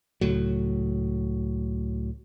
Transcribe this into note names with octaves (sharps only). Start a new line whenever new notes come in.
C#2 A2 F#3